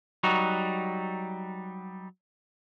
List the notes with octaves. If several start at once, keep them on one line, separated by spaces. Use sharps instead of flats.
F#3 G3 D#4 F#4